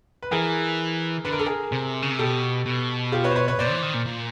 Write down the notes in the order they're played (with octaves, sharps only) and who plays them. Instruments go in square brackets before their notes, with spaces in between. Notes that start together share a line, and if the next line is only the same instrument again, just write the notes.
[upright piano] B4
[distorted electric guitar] E3 [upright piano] G#4 A#4
[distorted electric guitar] D3 [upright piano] B4
[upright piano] A#4
A4
G#4 A#4
[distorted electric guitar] C3
C#3
C3
[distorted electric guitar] B2 [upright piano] G4 A4
[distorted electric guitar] B2
[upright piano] F4 G4
B4 C#5
C5
B4 C#5
B4 C#5
[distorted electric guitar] A#2 [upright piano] C5 D5
[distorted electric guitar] E3
D#3
A#2
A#2